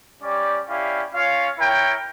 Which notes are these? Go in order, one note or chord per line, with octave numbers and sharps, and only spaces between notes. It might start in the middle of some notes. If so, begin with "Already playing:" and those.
G3 C#4 G4 D5
C#4 E4 G4 D5 F5
C#4 F4 C#5 F5
E4 A#4 C#5 G5